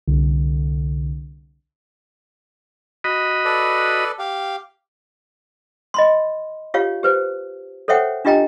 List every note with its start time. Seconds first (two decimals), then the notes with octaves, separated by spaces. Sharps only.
0.08 C2 D3
3.04 F#4 D#5 B5
3.45 A4 B4 D5
4.19 G4 F5
5.94 D#5 B5 C6
6.74 F4 G4 C#5 F5
7.03 G4 B4 C5
7.88 A4 C5 C#5 E5 F#5 G5
8.25 D4 F4 G4 D#5 G5 A#5